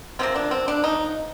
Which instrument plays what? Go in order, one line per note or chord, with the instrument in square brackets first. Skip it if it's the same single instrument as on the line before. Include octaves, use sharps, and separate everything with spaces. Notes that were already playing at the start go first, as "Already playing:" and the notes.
[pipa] C3 F3 A#3 C4
D4
C4
D4
D#4